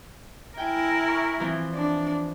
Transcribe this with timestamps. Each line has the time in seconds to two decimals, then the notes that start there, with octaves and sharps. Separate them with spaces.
0.58 E4 A#4 G5 G#5
1.09 C#6 F6
1.40 E3 F3 C4
1.75 D4